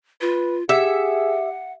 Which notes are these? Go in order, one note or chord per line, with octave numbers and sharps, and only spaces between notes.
F4 B4
G4 G#4 E5 F#5